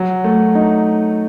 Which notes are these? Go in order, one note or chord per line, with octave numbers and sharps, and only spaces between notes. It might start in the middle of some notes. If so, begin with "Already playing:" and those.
Already playing: F#3
A3
D#4